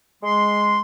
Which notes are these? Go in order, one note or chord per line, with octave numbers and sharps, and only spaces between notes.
G#3 C6